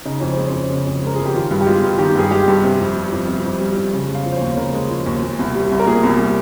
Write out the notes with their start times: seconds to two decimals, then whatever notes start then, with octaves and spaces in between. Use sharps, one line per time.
0.05 C#3 D#4
0.20 F2 C#4
0.33 G#3 C4
0.47 C#4
0.53 F2
0.70 C#3
0.86 F2
1.02 G#3 A#4
1.16 F2 G#4
1.26 G4
1.34 D#3 F4
1.51 G2
1.61 G4
1.66 G#3 F4
1.83 G2
1.98 D#3 G4
2.15 G2 G#4
2.31 G#3 G4
2.48 G2
2.64 C3 C5
2.80 F2
2.96 G3
3.12 F2
3.28 C3
3.45 F2
3.61 G3
3.76 F2
3.93 C#3
4.09 G#3
4.15 F5
4.26 F3
4.32 C5
4.37 D#2 C#5
4.57 C#3 A#4
4.73 G#3
4.91 F3
5.06 D#2
5.23 A#2
5.39 C2
5.55 G3
5.71 C2
5.80 A#4
5.87 A#2 G#4
6.03 C2
6.19 G3